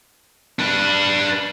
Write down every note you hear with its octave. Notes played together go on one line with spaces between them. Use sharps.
D4 B4